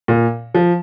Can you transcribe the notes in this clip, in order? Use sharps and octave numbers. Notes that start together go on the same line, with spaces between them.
A#2
F3